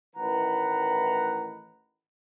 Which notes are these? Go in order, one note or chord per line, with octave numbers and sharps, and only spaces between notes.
A1 A2 D#3 B4 F#5 A#5